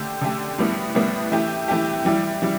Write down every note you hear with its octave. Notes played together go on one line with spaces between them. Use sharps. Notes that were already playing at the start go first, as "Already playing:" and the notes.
Already playing: D3 A3 G4
D3 A3 G4
A2 G3 B3 E4
A2 G3 B3 E4
E3 A3 E4 G4
E3 A3 E4 G4
E3 G3 E4
E3 G3 E4